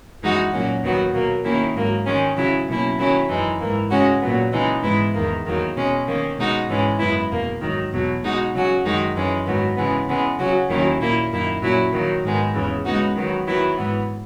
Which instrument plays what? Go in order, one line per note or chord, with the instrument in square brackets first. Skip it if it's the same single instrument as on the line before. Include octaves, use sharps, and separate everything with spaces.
[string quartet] F#2 E3 G#3 D#4 F#4
A#2 F#3 A#3 C#4 F#4
D#2 D#3 F#3 B3 F#4
B2 F#3 A#3
D#3 A#3 C#4 E4
G#2 F#3 A#3
D#3 G#3 C#4
C#3 F#3 C#4 E4
B2 F#3 A#3 C#4 E4
D#3 F#3 C#4 E4
F#2 E3 G#3 D#4
G#2 E3 A#3
C#3 G#3 C#4 F#4
A#2 F#3 B3
C#3 E3 G#3 D#4
G#2 E3 G#3 B3 E4
E2 D#3 A#3
E2 D#3 F#3 A#3
B2 G#3 C#4
D#3 A#3 C#4
B2 G#3 D#4 F#4
G#2 E3 G#3 C#4
F#2 C#3 G#3 B3 E4
E2 B2 A#3
G#2 D#3 F#3
E2 B2 F#3
B2 G#3 D#4 F#4
C#3 F#3 C#4 F#4
F#2 D#3 G#3 D#4 F#4
F#2 E3 G#3 C#4
G#2 D#3 F#3 B3
C#3 E3 G#3 B3
C#3 E3 G#3 B3
C#3 F#3 C#4 F#4
D#2 D#3 F#3 C#4 E4
A#2 A#3 E4
F#2 D#3 A#3 E4
A#2 F#3 C#4 E4
D#3 F#3 A#3
G#2 D#3 G#3 B3
E2 C#3 E3
C#3 G#3 B3 D#4 F#4
D#3 F#3 B3
D#3 F#3 B3 E4
G#2 E3 B3